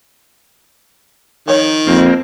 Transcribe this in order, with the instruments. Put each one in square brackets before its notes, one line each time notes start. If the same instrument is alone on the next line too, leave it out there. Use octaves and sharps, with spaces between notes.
[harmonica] D#3 [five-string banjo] F3 D#4 C#5
[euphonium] F2 [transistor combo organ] A#3 C4